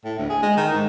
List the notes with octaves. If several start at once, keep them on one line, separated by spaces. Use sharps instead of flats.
A2
D2
G#4
G#3
D#3
G#2